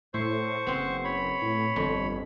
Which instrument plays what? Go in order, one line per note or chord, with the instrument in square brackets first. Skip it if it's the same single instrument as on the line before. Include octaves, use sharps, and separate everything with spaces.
[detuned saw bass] A2 [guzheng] E4 [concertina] C5 C#6
[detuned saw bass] F#1 [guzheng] B3 C4
[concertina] C#5 B5
[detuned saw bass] A2
[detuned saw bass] G1 [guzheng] F2